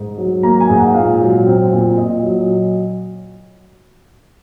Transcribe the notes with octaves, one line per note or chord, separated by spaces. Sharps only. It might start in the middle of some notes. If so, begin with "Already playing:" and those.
Already playing: G#2
F#3
A#3 A#5
G#5
G#2
F#5
A#2 F5
F#3
C4
A#2
A#2 D#5
F#3